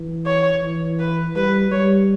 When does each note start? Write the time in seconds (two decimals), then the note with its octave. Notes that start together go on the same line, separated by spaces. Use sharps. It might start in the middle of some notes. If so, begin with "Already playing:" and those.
Already playing: E3
0.26 C#5
0.62 E3
0.99 B4
1.36 G3 B4
1.72 G3 C#5